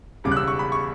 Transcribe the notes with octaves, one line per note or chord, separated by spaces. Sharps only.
E1 E2 C#3 G3 D6
F#6
E6
C#6
B5
C#6